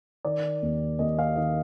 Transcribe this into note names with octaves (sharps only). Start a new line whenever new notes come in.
D#3 D5
D#2
D#2 D#5
F5
D#3 D#5